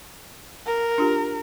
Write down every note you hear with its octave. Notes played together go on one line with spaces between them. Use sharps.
A#4
D4 F4 G4